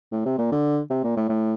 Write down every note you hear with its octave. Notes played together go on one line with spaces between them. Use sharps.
A2
C3
A#2
D3
C3
A#2
A2
A2